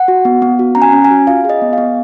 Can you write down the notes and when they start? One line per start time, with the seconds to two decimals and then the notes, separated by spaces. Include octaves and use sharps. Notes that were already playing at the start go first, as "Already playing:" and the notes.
Already playing: F#5
0.08 F#4
0.25 B3
0.42 B3
0.59 F#4
0.75 C#4 A#5
0.82 G#5
0.93 C#4
1.04 G#5
1.10 F#4
1.27 F4 F5
1.45 G#4 D#5
1.62 B3
1.73 B3 F5